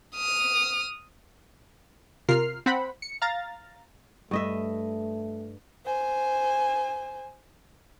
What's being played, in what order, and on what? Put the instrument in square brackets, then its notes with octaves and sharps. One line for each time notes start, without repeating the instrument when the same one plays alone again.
[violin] D#6 F6
[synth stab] C3 F4 A#4 F6 C7
C4 C5 F#5 B5
C#7
F5 A#5 A6
[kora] G2 D#5 E5 [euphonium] A3
[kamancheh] C5 G#5